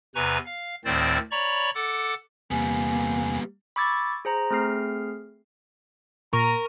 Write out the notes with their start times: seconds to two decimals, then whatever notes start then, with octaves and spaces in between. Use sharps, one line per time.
0.15 E2 C3 B4 G#5 A#5 C#6
0.45 F5
0.85 D2 A2 D#3 C4 C5 D5
1.31 C#5 D5 A#5 B5 C#6
1.75 A4 F#5 D6 A6
2.51 E2 C3 G3 A#3 B3 G#5
3.76 B5 C#6 D6 E6 G#6 A6
4.25 G#4 C5 A#5
4.51 A3 C4 G#4 F6 C7
6.33 A#2 A#4 A#5 C#6